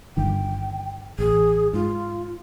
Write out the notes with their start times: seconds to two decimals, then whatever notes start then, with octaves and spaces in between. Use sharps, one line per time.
0.17 G1 G2 D#3 G5
1.19 A1 G#4
1.73 G#2 F4